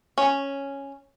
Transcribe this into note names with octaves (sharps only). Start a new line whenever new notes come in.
C#4